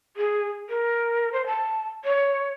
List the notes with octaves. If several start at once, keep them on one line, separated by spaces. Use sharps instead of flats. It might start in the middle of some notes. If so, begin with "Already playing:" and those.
G#4
A#4
C5
A5
C#5